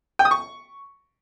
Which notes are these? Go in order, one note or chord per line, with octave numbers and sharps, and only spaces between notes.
G5
D#6
C#6